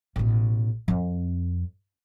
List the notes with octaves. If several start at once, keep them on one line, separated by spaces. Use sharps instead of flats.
A1 B2
F2 C4